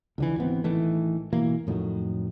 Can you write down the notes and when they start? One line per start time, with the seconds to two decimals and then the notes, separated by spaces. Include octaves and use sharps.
0.18 C#2 D3 E3
0.38 G#1 E3 B3 C4
0.64 A1 D#3 E3 A3
1.32 B2 E3 A#3
1.67 F2 A2 D#3 F#3